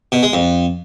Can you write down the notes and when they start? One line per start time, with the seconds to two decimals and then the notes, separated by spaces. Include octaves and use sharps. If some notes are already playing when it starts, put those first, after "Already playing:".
0.12 B2
0.23 G#3
0.33 F2